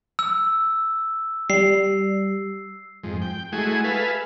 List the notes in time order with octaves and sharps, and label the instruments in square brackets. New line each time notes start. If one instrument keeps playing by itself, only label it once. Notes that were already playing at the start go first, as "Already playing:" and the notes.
[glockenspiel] E6
[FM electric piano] G3 [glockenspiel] C7
[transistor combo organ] F2 G#2
G5
G#3 A3 E4 F#4 G#4
G#4 A4 B4 E5 F5